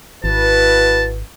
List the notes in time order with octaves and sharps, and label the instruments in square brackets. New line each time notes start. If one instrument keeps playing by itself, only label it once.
[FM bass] G#1 [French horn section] E4 F#4 B4 [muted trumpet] A5